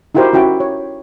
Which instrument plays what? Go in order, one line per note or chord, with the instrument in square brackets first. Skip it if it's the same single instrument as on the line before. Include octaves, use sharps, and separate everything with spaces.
[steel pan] D#4 E4 F#4 G4 A#4 C5
C#4 E4 F#4 G5
C#5